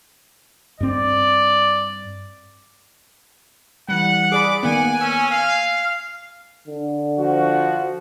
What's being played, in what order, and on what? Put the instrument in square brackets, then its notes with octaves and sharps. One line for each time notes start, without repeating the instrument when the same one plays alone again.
[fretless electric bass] G2 C4 [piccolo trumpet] D5
[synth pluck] E3 G3 [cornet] F#5
[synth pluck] G#4 D5 B5 [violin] D6
[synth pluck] D#3 A#3 B3 [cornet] F#5 [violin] G#5
[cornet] C#4 [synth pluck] E6
[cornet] F5
[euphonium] D3
[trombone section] F3 F#4